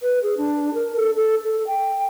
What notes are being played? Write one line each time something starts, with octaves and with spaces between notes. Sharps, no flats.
B4
G#4
D4
A#4
A4
A4
A4
G5